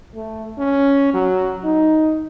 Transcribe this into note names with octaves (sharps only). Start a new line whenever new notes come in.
A3
C#4
F#3
D#4